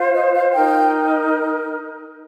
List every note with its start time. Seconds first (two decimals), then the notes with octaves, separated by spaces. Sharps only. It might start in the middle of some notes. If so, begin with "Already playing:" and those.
Already playing: F4 C5
0.14 D#5
0.34 F5
0.54 D#4 A#4 G5